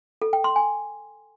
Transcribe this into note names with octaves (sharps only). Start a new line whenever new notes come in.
A4
G5
C6
G#5